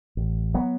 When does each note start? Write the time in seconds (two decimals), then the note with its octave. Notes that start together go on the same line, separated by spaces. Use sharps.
0.17 A1
0.54 F#3 B3